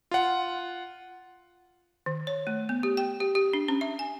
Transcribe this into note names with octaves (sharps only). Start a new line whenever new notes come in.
F4 F#5
D#3
C#5
A3
B3
G4
G5
G4
G4
D4
C#4
E5
G#5